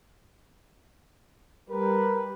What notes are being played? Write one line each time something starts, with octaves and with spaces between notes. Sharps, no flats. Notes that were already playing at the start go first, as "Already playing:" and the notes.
G3 A#4 B4